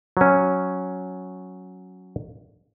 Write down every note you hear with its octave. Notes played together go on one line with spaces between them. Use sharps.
F#3 C#4